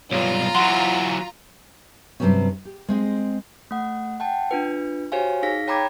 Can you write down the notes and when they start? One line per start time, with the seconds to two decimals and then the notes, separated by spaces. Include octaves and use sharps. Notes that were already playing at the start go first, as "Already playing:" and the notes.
0.11 B1 G2 F4 C#5 A#5
0.55 E3 F#3 F#5 C6
2.20 G2 C3 F3 F#3 C4 C#4
2.65 G4
2.88 G#3 C4 D#5
3.71 A3 F#5
4.20 F#5 G5 A5
4.51 D4 F4 B4
5.12 F#4 G4 C5 C#5 F5 G#5
5.43 D#4 G#4 F5 A#6 B6
5.67 C#5 G5 A#5 B5 D6 G#6